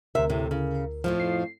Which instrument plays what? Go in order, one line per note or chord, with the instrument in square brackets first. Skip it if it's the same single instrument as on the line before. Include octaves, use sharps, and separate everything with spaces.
[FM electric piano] D2 A#4 [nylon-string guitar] C3 E5
[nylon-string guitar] A2 C3
C#3
F2 A2 F3
[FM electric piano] C7